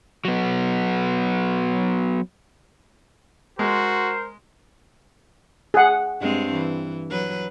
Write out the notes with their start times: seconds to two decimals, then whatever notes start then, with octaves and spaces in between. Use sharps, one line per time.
0.25 F#3 B3
3.59 G#3 F#4 A#4 C5
5.74 G#4 F#5
6.20 G2 G#3 C4
6.53 E3
7.10 F#3 B4